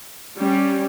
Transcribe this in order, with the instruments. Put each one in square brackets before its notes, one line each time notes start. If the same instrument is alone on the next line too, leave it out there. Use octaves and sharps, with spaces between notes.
[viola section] G3 [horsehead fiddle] C#4